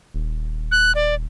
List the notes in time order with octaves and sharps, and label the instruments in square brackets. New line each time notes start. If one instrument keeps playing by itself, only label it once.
[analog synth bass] D#1
[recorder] F#6
D5